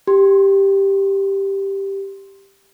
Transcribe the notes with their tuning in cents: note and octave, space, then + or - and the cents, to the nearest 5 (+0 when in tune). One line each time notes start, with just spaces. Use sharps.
G4 +0 C6 +5